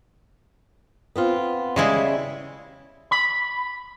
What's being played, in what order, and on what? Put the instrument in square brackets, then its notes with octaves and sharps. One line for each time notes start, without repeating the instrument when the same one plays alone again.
[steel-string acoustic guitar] B3 C4 F4
[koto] C#3 G#3 E4 [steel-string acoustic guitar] G3
[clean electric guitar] B5